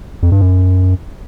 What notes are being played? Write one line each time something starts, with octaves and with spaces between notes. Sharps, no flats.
F2
G2
F#2